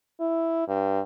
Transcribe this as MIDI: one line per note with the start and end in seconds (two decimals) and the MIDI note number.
0.20 0.63 64
0.68 1.00 43